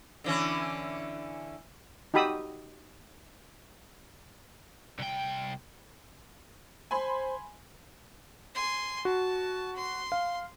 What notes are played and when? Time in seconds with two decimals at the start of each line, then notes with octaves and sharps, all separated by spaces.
0.24 D3 E3 C#4
2.14 D#4 F#4 G4 B5 D#6 E6
4.99 C2 G5
6.91 C5 G#5 B5 C6
8.55 G#5 C6
9.05 F#4 A5
9.76 C6
10.12 F5